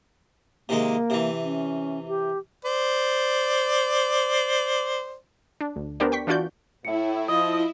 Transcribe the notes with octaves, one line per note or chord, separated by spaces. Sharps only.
C3 D#3 G#3 A#3
C3 E3
C#4
G4
C5 D5
D4
D2
B3 D4 G4 A#4 C5 D5
G5 C#6 B6
E3 D4 F4 F#4 D5 G6
A2 E4 E5 C#7
F3 D#5 D#6